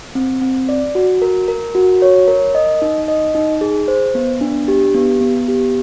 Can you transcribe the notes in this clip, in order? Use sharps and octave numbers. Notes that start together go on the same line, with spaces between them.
C4
C4
D5
F#4
A#4
A#4
F#4
C#5
A#4
D#5
D#4
D#5
D#4
G#4
C5
B3
D4
G4
B3
B3
G4